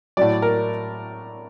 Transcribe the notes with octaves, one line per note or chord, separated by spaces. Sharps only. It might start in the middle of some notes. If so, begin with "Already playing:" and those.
A2 F#3 D5
A#4